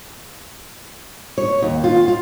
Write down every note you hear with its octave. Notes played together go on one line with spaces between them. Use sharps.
C#5
D#2
F4
F4